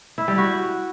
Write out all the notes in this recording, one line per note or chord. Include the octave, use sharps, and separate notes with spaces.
E4
G3
F#4